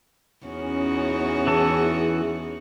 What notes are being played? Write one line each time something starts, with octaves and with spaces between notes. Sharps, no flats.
E2 C#4 D#4 F#4
E3 G#4 A5